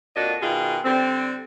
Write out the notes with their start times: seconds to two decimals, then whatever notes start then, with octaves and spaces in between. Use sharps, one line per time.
0.15 F2 A#2 D4 F#4 D#5
0.41 B2 D#3 F4 G#4
0.84 D3 G3 C4